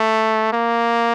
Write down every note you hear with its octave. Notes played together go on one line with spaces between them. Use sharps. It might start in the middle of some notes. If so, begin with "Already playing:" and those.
Already playing: A3
A#3